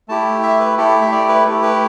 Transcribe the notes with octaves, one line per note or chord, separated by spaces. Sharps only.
A3 E4 G4 A5
E5
B4
A3 E4 G4 A4
E5
D5
B4
A3 E4 G4 A4
B4